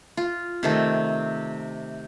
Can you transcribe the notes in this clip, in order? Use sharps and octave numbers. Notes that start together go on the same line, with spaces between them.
F4
C3 D#3 A3